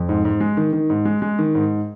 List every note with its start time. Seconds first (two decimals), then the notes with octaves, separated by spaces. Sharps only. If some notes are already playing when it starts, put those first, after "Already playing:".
Already playing: F2
0.09 G#2
0.25 G#2
0.40 G#3
0.57 D#3
0.73 D#3
0.90 G#2
1.05 G#3
1.22 G#3
1.39 D#3
1.55 G#2